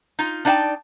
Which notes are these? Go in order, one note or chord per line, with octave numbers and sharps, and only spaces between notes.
D#4 F4
D4 D#4 D5 F5 G5 A5